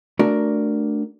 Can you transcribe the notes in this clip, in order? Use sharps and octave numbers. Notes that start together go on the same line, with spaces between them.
A3 D4 F#4 A#4 D5